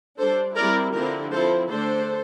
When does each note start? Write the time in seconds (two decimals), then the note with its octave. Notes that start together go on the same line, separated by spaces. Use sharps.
0.18 G3 D4 A4 C5
0.55 G3 C4 E4 A#4 D5
0.93 D3 F3 C4 E4 G4 A#4
1.32 F3 C4 E4 A4 C5
1.70 D3 A3 D4 A4 C5